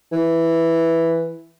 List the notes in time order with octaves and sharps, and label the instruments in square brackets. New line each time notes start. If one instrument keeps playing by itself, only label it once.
[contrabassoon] E3